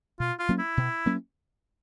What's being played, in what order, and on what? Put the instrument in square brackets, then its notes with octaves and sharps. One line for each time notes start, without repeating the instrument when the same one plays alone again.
[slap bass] B2 [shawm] F4
[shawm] F4
[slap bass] F#3 A#3 C#4
[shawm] E4
[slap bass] B2
F#3 A#3 C#4